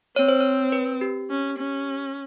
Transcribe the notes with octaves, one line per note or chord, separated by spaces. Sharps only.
C4 C#5
C5
C#5
B4
G4
C#4
C#4